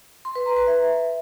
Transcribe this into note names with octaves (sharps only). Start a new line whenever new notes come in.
C6
B4
A#5
B4
E5